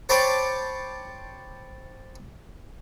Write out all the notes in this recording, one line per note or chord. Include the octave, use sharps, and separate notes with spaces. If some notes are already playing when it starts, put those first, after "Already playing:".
C5 C#5 G5 A5 B5 D6